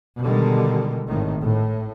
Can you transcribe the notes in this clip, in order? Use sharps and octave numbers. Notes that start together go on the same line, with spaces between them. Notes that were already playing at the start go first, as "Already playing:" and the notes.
B2 D3 D#3 G3 G#3
G#1 A2 D#3
A2